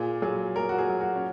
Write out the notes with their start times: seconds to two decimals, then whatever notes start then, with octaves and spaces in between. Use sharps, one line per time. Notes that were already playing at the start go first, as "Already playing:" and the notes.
Already playing: A#2 G#4
0.22 F#3 G#4
0.56 F#3 A#4
0.69 F#4
0.78 G#4
0.89 F#3
1.01 F#4
1.15 C#4